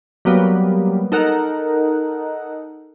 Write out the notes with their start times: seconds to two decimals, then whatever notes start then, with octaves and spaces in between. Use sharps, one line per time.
0.25 F#3 G3 A#3 B3 B4
1.12 D#4 A4 A#4 F#5